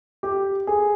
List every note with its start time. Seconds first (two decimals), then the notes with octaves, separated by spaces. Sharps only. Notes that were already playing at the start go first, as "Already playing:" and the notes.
0.23 G4
0.67 G#4